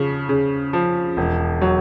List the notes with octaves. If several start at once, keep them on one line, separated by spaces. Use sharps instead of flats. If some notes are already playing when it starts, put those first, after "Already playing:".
Already playing: C#3 F3
C#3
F3
E1
F#3